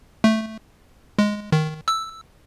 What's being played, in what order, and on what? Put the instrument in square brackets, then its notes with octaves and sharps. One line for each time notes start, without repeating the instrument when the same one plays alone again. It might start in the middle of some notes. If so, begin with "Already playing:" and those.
[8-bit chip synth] A3
G#3
D#3
E6